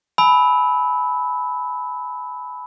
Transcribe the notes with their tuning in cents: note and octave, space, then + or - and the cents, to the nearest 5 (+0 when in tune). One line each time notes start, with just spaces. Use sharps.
G#5 +35 B5 +5 E6 -25